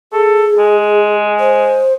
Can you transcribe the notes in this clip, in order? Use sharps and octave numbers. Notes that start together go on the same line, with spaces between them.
G#4 A4
G#3
C5